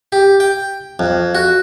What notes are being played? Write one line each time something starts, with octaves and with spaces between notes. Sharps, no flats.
G4
G5
F2
F#4